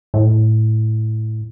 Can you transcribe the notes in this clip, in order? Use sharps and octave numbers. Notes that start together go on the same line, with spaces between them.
A2